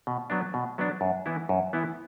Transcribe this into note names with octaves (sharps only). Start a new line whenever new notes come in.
B2
F#3 B3 D4
B2
F#3 B3 D4
F#2
E3 B3 E4
F#2
E3 B3 E4